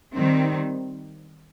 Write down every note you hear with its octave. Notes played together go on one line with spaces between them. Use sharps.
D#3 G3 C4